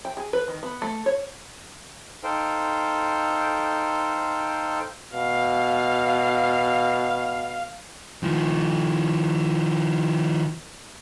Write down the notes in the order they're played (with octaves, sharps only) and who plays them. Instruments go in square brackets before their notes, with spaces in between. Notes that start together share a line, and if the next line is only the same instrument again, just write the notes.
[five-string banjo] G5
G#4
B4
D#3
B3
A3
C#5
[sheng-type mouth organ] D#4 A4 C5 F5 G5
[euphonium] B2 [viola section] F5
[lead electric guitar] D#3 F3